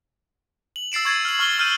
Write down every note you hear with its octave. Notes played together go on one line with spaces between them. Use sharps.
F#7
E6 A6 C7 D7 E7
C#6 G#6 A6 C7
F6 F#7
C#6 F6 G7
E6 F6 G6 D#7